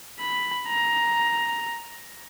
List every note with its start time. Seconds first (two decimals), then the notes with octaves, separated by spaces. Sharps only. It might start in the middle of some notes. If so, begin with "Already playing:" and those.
0.20 B5
0.68 A#5